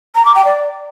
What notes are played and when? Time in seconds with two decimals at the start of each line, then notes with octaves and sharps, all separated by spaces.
0.15 A#5
0.25 D6
0.35 G5
0.45 D5